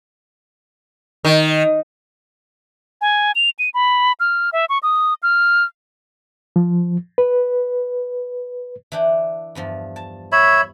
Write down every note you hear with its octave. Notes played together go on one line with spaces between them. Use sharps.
D#3
G#5
F7
D#7
B5
F6
E5
C#6
D#6
F6
F3
B4
E3 D4 G5
E2 G2 F3
A5
C#5 E5 B5